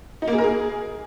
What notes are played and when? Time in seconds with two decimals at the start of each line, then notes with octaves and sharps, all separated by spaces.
0.22 D#4
0.28 A#3
0.33 G#4
0.38 A#4
0.44 G#4